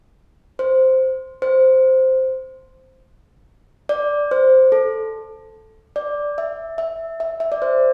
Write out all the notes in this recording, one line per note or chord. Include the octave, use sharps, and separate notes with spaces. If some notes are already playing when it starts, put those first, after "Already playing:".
C5
C5
D5
C5
A4
D5
E5
E5
E5
E5
D5
C5